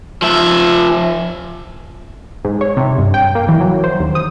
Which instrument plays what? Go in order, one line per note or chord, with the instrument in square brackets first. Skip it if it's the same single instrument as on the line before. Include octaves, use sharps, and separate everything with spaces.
[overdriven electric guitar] F3 E5
[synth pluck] G#2
C#5
C3
G2
G5
A#3
E3
F#3
C5
D#2
D#6